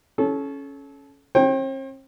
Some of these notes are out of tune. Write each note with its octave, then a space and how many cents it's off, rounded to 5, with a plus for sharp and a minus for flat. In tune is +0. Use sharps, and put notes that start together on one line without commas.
C#4 +0 A4 -30
C4 +45 C5 +45 G5 +0